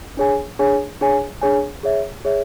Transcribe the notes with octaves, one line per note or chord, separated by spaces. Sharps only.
D4 G#4 C#5 G#5
D4 G#4 C#5 G#5
D4 G#4 C#5 G#5
D4 G#4 C#5 G#5
G#4 C#5 E5
G#4 C#5 E5